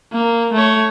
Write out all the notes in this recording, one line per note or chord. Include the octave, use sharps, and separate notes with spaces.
A#3
A3 C#5